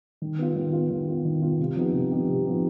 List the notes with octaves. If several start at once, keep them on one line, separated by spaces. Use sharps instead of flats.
D#3
B3 F4
D#3
B3 F4
D#3
B3 F4
D#3
B3 F4
C3
F3 B3 D#4 G4
C3
F3 B3 D#4 G4
C3
F3 B3 D#4 G4